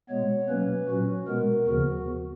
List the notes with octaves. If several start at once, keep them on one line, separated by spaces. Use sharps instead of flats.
B2 G#3 B3 C#5
B2 F#3 A#3 C#4 B4
A#2 F#3 C#4 F#4
B2 G#3 B3 A#4
D#2 C#3 F3 B3 F#4